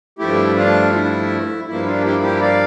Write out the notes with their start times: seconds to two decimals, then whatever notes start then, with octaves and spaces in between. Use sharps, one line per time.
0.19 G2 F3 A3 E4 G4
0.56 D4 F4
0.94 E4
1.67 G2 F3 A#3 E4
1.86 D4 F4
2.04 E4 G4
2.23 E4 G4
2.41 D5 F5